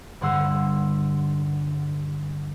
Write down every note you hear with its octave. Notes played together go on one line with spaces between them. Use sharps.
G2 D3 F#5 C6 E6